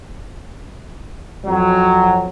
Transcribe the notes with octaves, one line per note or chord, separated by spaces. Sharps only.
F2 F#3